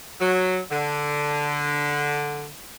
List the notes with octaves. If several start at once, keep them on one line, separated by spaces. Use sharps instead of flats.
F#3
D3